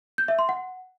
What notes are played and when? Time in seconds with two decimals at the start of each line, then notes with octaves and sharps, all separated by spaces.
0.18 G6
0.28 E5
0.39 C6
0.49 F#5